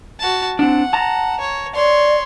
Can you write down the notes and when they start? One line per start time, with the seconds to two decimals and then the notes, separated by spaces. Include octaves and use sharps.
0.20 F#4 A5
0.59 C4 D4 F#5
0.93 A5 A#5
1.40 C#5
1.75 C#5 D5 C6